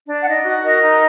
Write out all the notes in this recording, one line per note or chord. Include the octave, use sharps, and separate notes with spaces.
D4
F#5
D#4 D#5
F#4
A#4 D#5
D#4